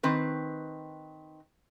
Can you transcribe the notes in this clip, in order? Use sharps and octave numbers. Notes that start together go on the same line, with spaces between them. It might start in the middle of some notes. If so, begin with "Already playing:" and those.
D#3 C4 B4